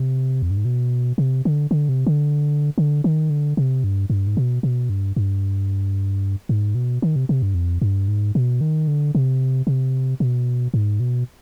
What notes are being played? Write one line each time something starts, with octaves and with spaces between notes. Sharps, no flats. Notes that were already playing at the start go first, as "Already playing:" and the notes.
Already playing: C3
F2
G2
G#2
B2
C3
D3
D3
C3
D3
D3
D#3
D3
C3
G2
G2
G#2
B2
B2
G2
G2
G#2
B2
D#3
C3
C3
G2
F2
G2
G#2
B2
D#3
D3
C3
C3
B2
G#2
B2